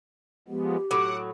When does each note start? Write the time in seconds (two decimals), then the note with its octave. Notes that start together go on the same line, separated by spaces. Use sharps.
0.48 F3 G#3 B3 G4
0.91 A2 F#3 F#5 D6